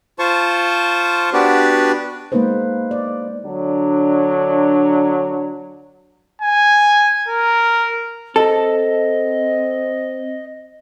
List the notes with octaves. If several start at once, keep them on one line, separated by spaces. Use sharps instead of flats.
F4 C5 A5 C#6
B3 D4 F#4 G4 B4 D5
G#3 A#3 B3 D#4 B4 C5
D5
D3 F#3 D4
G#5
A#4
C4 A4 D#5